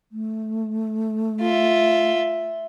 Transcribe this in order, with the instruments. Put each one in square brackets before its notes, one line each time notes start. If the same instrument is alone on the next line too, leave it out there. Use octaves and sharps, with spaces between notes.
[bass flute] A3
[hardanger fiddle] F4 E5